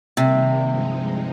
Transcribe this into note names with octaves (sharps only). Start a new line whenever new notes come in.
C3 D#3 G3 A#3
G2 F3 G#3 D#4